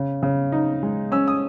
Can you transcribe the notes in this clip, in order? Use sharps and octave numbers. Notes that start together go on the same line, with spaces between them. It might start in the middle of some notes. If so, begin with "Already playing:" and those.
Already playing: C#3
C#3
D#4
G#3
C#4 E6
D#6